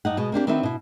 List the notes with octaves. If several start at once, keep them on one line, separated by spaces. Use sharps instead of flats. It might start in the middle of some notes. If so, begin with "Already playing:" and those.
G2 D#4 F#5
B2 G#3
A#3 C4 D4 G4
D#3 C4 D4 F#4 B4 E5
B2 E4